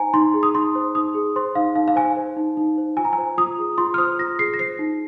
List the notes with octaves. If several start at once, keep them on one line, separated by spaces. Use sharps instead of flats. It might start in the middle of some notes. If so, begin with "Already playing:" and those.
Already playing: D#4 C5 G#5 A#5
D#4 C6
G#4
D#6
D#4 C6
C5
D#4 D#6
G#4
C5 C6
D#4 F5
D#4 F5
F5
C5 G#5
C5
D#4
D#4
C5
F4 G#5
A#5
G#5
C5
F4 D#6
G#4
F4 C6
F6
C5 D#6
F4 A#6
G#4 C7
A#6
C5 C7
D#4